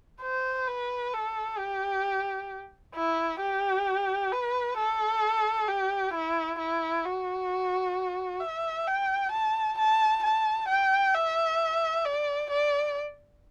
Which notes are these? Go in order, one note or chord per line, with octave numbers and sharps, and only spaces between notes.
C5
B4
A4
G4
E4
G4
B4
A4
G4
E4
E4
F#4
E5
G5
A5
A5
A5
G5
E5
D5
D5